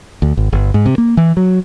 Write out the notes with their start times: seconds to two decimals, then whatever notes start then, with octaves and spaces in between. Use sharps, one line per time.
0.22 D2
0.37 G#1
0.52 G1
0.74 G#2
0.86 C3
0.98 A#3
1.17 E3
1.37 F#3